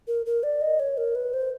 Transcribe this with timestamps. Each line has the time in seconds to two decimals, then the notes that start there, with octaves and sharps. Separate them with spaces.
0.08 A#4
0.26 A#4
0.43 D5
0.61 D#5
0.80 C#5
0.97 A#4
1.15 B4
1.34 C5